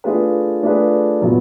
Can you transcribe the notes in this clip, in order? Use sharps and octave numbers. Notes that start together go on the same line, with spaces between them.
A3 D4 F4 G#4 B4
A3 D4 F4 G#4 B4
A#2 F#3 B3 E4